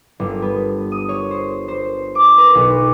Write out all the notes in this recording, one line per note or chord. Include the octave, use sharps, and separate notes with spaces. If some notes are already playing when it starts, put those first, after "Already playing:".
G1
B3
D#6
C#5
C5
C5
D6
B4
B1